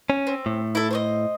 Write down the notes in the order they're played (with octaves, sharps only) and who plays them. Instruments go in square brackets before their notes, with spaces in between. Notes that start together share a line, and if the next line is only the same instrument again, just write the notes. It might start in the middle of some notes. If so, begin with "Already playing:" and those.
[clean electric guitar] C#4
[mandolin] C4
[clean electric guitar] A2
[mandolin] E4 A4
C5 C#5 D#5